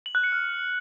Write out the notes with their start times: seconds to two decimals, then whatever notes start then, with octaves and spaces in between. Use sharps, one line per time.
0.06 F#7
0.15 F#6
0.24 C#7
0.32 F6